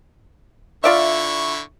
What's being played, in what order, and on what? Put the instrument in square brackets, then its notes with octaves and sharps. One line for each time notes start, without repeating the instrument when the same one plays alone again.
[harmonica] D3 E4 C#6 [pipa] F4 D5 E5